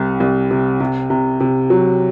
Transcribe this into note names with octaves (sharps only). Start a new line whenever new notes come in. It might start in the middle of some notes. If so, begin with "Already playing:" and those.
Already playing: C2 C3
C2
C3
C3
C3
C3
F#3